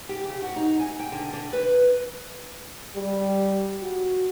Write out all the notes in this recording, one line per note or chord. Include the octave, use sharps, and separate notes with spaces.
G4
C#3
F#4
D#4
G#5
G5
D3
D3
B4
G3
F#4